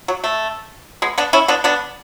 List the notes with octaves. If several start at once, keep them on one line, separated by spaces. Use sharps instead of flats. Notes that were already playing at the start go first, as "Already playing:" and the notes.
F#3
A3
G#3 B3
B3 D4
C#4 E4
B3 D4
B3 D4